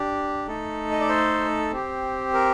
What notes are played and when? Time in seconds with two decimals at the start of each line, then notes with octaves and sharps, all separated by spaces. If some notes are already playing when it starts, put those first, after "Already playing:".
Already playing: D4 G4
0.48 A3 D#4 A4
0.91 D#5
1.00 D5
1.09 C5
1.71 C4 G4
2.33 A#4